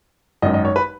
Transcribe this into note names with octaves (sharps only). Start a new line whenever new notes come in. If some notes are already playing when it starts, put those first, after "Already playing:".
G#1 F#2 D#3 D#5
D#5
C#5
B4